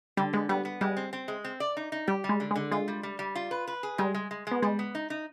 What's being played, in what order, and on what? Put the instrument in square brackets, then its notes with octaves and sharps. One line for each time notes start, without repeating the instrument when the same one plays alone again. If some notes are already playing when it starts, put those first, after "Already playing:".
[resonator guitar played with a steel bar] D3 [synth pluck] G3
[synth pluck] G#3 [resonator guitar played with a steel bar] B3
[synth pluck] G3 [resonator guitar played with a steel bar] B3
[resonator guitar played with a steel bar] B3
[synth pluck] G3 [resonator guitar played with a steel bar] G#3
[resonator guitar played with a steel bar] C4
C4
G#3
C4
D5
D#4
D#4
[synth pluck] G3 [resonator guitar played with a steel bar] G4
[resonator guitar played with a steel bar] G3
[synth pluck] G#3
[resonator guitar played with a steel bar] D3
[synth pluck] G#3
[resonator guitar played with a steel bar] D3
[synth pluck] G#3 [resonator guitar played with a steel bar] F4
[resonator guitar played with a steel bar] G3
G3
G3
F4
B4
B4
G#4
[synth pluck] G3 [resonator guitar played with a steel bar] G#3
[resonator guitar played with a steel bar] G#3
G#3
[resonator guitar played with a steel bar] G#3 [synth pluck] B3
[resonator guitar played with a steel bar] G3 [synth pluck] G#3
[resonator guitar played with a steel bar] B3
D#4
D#4